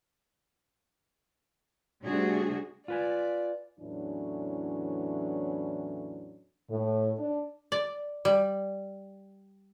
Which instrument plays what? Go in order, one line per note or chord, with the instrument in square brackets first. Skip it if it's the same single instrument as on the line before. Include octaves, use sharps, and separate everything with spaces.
[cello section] C3 G3 A3 D4 F#4 G#4
[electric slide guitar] F4 B4 G#5 [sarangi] D5
[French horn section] E2 A2 E3 F#3 C#4 D4
A2
D4
[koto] D5
G3